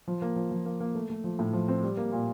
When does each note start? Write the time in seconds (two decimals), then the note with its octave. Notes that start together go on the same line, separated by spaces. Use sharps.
0.08 F3
0.22 A#3
0.36 F3
0.51 F3
0.66 A#3
0.80 A#3
0.95 A3
1.09 A3
1.24 F3
1.39 A2
1.53 F3
1.68 C4
1.83 G3
1.97 A#3
2.12 A#2